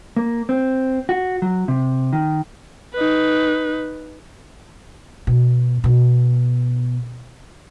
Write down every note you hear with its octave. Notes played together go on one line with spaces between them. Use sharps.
A#3
C4
F#4
F#3
C3
D#3
D#4 B4
B2
B2